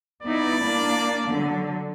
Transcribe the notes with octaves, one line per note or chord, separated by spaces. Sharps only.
B3 D#4 E4 D5
A#3 D4
D3 F#3